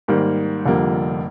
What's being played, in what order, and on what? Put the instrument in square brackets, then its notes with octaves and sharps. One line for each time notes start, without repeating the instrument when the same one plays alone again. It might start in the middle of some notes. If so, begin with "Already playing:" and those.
[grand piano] G#2 D#3 G3 A#3
F1 F2 D3 G3 A#3